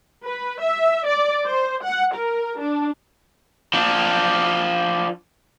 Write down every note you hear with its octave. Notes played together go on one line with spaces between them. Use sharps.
B4
E5
D5
C5
F#5
A#4
D4
F3 D4